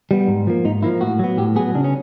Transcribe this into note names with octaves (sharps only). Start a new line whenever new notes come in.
G3 B3
G#2
F3 A#3
G#2 D#4
F3 A#3 E4
A2 F#4
F#3 B3
A2 G4
F#3 B3 G#4
C#3 D4
C#4